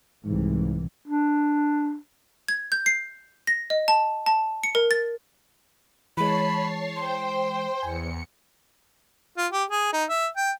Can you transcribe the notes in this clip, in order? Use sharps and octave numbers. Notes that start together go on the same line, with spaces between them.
C2 G#2 E3
D4
G#6
G6
C7
A#6
D#5
A5
A5
C#7
A#4
A6
E3 G#3 C#5 A5 B5 C7
C5 G5 C6
E2 G#5 C#7
F4
G4
G#4
D#4
E5
G5